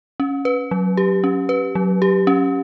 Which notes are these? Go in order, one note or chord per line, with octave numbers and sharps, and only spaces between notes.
C#4
B4
F#3
G4
C#4
B4
F#3
G4
C#4